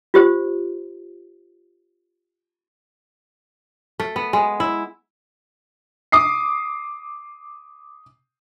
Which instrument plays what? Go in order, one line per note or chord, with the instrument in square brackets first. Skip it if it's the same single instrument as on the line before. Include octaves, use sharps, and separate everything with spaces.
[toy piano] F4 G4 C5
[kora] A3
B3
G#3
E4
[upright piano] D6 D#6 C7